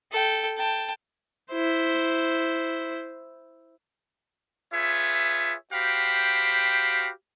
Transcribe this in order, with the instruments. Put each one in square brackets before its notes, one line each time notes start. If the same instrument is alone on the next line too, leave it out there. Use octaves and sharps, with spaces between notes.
[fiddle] A4 G5
G5 A5
[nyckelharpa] E4 C5
[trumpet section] F4 G#4 B4 C#5 E5
F#4 G4 C5 F5 G5 B5